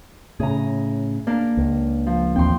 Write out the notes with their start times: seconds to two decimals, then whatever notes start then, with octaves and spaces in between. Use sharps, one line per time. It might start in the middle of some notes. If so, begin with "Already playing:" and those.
0.40 A2 C#3 G#4 A#5
1.27 A#3 D4 A#4
1.57 C#2
2.06 F3
2.36 A1 D#2 C4 G5 C6